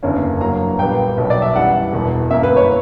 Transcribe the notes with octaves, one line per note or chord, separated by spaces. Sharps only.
F#1 E2 D3 A#3 C#4
G2 F#3 A#3 A#5
A#1 A#2 G3 B3 G5
B1 B2 F#3
D5
E5
F#2 E3 G3 F#5
E1 E2 B2
G1 F#2 E3 A#3 E5
B4
C#5